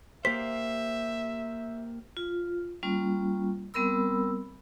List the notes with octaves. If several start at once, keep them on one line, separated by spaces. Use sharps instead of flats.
A#3 G4 C5 E5 B6
F4
G3 A#3 C#4 F4
G3 B3 C4 A#4 B5 E6